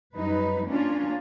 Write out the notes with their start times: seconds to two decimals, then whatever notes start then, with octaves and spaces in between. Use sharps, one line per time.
0.15 F#2 G3 D#4 B4
0.67 A#3 C#4 D4 F4